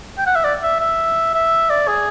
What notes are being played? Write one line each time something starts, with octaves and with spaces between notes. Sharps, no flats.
G5
F#5
E5
D5
E5
E5
E5
D5
G#4